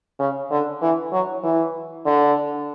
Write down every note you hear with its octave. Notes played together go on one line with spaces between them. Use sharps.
C#3
D3
E3
F#3
E3
D3